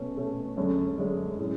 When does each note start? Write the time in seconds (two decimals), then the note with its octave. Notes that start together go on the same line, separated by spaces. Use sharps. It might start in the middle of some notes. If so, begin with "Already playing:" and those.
Already playing: B2 A3 C#4
0.16 B2 A3 C#4
0.57 F#2 D3 G#3 C#4
0.98 F#2 D3 G#3 C#4
1.39 A2 G#3 C#4